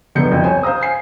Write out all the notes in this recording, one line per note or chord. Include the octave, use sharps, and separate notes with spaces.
F1 D3 F#3 B3 G6 C#7
C2 F2
C5 C#5 G#5
C5 F5 A#5 D#6
G#5 C7